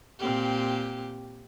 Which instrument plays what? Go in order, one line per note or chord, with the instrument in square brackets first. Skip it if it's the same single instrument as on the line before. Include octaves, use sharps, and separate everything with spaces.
[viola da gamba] A#2 C4 G4